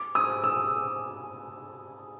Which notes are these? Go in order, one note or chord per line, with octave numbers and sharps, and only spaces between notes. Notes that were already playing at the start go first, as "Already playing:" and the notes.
Already playing: D6
D#6
E6